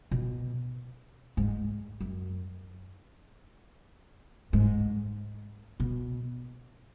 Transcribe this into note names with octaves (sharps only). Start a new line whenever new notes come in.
B2
G#2
F#2
G#2
B2